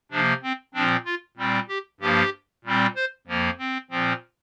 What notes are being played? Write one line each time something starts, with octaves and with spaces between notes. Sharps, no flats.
C3 F3 A#3 D4
C4
A#2 F3 C4 D4
F4
A#2 G3 C4
G4
G2 F3 A#3 G4
A#2 G3 C4
C5
F2 F3 A#3
C4
A#2 F3 C4